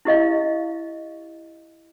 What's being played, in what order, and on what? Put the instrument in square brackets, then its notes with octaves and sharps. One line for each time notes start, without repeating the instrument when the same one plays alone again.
[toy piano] E4 G4 D#5 F5